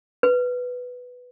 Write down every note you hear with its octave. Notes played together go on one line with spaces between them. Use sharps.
B4